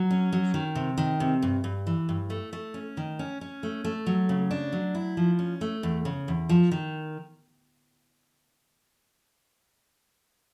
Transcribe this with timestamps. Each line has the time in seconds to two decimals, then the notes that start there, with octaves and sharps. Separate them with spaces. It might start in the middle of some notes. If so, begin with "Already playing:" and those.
Already playing: F#3
0.11 C#4
0.32 F#3
0.54 D#3
0.75 C3
0.98 D#3
1.20 C3
1.42 G2
1.64 G2
1.87 E3
2.09 G2
2.30 A3
2.53 A3
2.74 C#4
2.97 D#3
3.19 C#4
3.41 C#4
3.63 A3
3.84 A3
4.06 F#3
4.29 C#3
4.51 D4
4.72 F#3
4.95 E4
5.17 F3
5.39 C#4
5.61 A3
5.83 E2
6.05 C#3
6.28 E2
6.49 F3
6.71 D#3